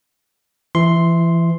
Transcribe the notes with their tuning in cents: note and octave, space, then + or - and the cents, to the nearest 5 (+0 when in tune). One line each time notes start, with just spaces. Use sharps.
E3 +30 E5 -5 C6 +0